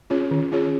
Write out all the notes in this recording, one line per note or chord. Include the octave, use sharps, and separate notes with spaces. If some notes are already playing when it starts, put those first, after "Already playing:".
C#4 F4 G#4 C#5
D#3
C#4 F4 G#4 C#5